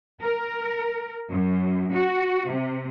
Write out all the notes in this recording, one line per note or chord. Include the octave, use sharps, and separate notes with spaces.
A#4
F#2
F#4
C3